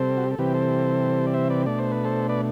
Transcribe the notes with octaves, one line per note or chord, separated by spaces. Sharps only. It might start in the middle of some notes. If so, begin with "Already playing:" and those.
Already playing: C3 G3 C4 A4 C5
F#4
G4
A4
C3 E3 G3 C4 G4 B4
A4 C5
D5
C5 E5
B4 D5
B2 A3 D4 D5
C5
B4
A4 C5
B4 D5